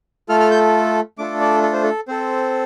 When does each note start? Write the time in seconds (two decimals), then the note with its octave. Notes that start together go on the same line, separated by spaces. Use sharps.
0.29 A3 F4 A4 F6
0.40 F6
0.51 G6
1.18 A3 D4 F4 A4 D6
1.40 D5
1.63 A4
1.73 C5
1.83 A4
2.08 C4 A4 C5